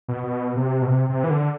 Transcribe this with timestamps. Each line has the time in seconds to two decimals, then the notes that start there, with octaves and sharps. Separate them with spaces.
0.08 B2
0.24 B2
0.56 C3
0.82 B2
0.87 C3
1.09 C3
1.24 E3
1.30 D3